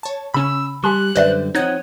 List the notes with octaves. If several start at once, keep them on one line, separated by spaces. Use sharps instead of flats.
C#5 A5
C#3 C#4 B5 E6
G3 G4 G#5 C6 F#6
F#2 D3 G3 B4 C5 D5 E5 G6
F3 C4 D#4 C#5 F#5 F#6 G#6 D#7